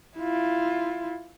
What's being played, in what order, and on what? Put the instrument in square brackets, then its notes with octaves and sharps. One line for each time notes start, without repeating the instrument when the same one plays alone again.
[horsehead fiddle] E4 F4